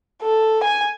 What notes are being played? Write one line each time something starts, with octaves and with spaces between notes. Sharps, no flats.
A4
G#5